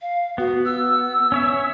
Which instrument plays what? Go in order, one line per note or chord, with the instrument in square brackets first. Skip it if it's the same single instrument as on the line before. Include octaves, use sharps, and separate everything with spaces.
[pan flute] F5
[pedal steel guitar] B3 [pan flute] F#4
[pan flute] E6
[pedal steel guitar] C#4 C#5 E5